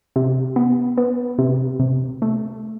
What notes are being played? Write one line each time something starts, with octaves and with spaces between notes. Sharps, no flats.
C3
B3
B3
C3
C3
A3